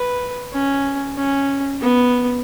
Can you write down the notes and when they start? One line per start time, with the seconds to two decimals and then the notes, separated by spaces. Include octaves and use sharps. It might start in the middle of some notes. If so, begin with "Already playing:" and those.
Already playing: B4
0.53 C#4
1.16 C#4
1.81 B3